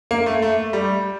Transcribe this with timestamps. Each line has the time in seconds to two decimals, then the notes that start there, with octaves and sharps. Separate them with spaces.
0.11 A#3
0.26 A3
0.42 A3
0.73 G3